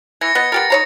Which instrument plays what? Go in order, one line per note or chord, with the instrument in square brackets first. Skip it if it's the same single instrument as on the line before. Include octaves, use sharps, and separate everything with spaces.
[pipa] E3 [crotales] G#6 A#6 C#7
[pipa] B3 D#5 [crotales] C#7
[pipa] B3 G4 A#4 [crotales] A6
[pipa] D#4 C#5 A#5